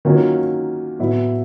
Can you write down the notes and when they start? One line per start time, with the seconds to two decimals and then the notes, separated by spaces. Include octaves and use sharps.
0.05 D#3 F#3 A#3 C#4 F4
0.99 A2 F#3 B3 E4